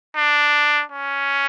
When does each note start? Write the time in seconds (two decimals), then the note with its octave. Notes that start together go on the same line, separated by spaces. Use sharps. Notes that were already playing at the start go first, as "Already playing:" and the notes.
0.16 D4
0.92 C#4